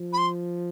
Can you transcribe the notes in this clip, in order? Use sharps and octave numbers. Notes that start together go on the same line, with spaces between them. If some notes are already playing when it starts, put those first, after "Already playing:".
Already playing: F3
B5
C6